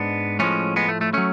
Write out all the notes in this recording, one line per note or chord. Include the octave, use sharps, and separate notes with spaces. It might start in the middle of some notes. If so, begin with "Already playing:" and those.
Already playing: G#2 G#3 B3 D4
A2 F3 G#3 A3 C#4
G#3 B3
A3
A3
F#3 A3 C#4